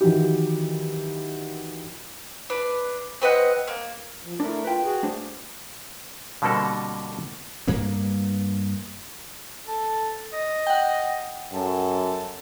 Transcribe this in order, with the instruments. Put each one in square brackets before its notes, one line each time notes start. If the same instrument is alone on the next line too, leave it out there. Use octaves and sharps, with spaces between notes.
[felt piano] D#3 E3 F#3 E4 G4
[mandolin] D4 B4
C4 B4 D#5 F#5
A#3
[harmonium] F3
[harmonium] A3 A#4 [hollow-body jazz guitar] D4 E4
[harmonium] F4 [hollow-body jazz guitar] B4 G5
[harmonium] F#4 G#4
[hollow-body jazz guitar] A3 D4 C5
[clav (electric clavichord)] B2 D3 G3 A#3 C4 A4
[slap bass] G2 A#3 B3
[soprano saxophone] A4
D#5
[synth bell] F#5 G5
[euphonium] F#2 [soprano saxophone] A4